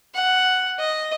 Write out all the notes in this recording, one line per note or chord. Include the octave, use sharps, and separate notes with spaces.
F#5
D#5